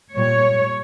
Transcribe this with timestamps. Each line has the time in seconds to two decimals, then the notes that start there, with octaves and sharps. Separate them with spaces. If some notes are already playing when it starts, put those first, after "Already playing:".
0.16 A#2 G3 C#5